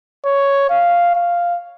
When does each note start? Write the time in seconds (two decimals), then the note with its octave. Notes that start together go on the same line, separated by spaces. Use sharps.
0.25 C#5
0.70 F5
1.15 F5